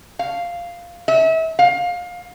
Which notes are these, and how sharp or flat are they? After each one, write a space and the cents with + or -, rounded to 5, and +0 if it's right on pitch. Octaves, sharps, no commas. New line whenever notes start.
F5 -5
E5 -35
F5 +25